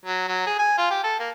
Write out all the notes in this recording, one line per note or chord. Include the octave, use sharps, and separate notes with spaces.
F#3
F#3
G#4
G#5
F4
G4
A4
A#3